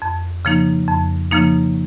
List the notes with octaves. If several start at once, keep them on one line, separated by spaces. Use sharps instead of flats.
F2
C#3 F3 A#3 D#4
F2
C#3 F3 A#3 D#4